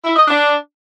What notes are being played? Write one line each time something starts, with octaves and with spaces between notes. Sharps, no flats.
E4
D#5
D4